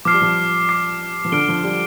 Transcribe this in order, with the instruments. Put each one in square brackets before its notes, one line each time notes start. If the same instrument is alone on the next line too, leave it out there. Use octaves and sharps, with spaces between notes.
[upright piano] F3 [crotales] D6 F6 C7
[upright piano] G3
F3
[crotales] D6 F6 C7
[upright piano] F3
[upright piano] D3 [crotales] F6 D7 G7
[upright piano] F3
G3